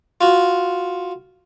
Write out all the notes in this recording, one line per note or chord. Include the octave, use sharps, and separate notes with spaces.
F4 F#4